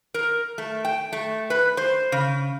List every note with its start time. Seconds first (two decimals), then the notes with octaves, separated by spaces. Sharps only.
0.14 A#4
0.58 A3
0.85 G5
1.12 A3
1.50 B4
1.77 C5
2.12 C#3